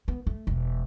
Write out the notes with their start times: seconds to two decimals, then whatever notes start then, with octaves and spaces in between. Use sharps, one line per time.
0.08 B3
0.27 A3
0.47 E1